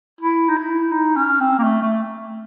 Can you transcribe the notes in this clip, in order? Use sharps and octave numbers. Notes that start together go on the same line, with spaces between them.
E4
D#4
E4
D#4
C#4
C4
A#3
A3
A3